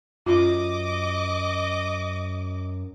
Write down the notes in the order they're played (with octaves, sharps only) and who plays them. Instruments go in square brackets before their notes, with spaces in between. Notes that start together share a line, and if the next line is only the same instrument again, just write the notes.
[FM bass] F#2 [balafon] F4 [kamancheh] D#5 D6